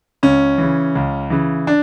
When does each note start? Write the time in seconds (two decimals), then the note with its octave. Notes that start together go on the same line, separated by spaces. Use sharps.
0.23 C#2 C#4
0.58 C#3 E3
0.95 C#2
1.30 C#3 E3
1.67 D4